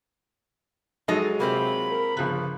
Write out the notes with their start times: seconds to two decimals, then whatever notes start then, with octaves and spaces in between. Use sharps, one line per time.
1.08 F#3 G#3 D#4 A4 D#5
1.40 C3 A#3 C4 F4 B5
1.91 A#4
2.17 G1 C#3 F3 F#6